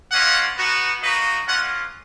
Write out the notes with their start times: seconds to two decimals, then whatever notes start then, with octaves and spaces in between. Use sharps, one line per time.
0.12 A#3 C#4 F4 D#5 F#5
0.57 B3 D#4 F#4
1.02 A#3 D#4 F#4 B4 D#5
1.47 A#3 C#4 F4 D#5 F#5